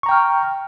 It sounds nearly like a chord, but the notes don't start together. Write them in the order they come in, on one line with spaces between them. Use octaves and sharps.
C#6 A#5 G5 F6